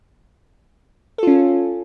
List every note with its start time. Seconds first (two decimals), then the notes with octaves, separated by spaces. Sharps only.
1.18 A4
1.23 F4
1.27 C#4